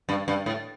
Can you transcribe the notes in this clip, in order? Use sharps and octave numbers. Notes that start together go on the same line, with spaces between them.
G2
G2
A2